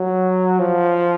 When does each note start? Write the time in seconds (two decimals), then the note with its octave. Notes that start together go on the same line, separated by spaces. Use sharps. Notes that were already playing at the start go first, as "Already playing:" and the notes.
Already playing: F#3
0.59 F3